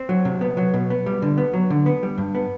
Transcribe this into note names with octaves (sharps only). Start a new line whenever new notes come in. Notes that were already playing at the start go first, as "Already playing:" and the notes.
Already playing: C4
F#3
C3
B3
F#3
B2
B3
G3
D3
B3
F#3
D3
B3
G3
G2
B3